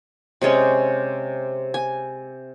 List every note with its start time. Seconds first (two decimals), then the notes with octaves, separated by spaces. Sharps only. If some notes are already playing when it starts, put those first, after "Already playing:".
0.42 C3 G#3 C#4 C#5
1.74 G#5